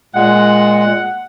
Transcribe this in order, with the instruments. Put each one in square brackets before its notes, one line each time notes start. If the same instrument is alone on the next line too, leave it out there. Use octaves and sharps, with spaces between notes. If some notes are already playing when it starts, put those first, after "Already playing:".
[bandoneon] A#2 G#3 [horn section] F#5